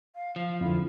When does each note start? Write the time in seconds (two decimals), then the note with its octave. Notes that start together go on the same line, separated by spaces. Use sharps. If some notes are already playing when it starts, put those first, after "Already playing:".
0.15 F5
0.36 F3 F5
0.61 F2 D3 E4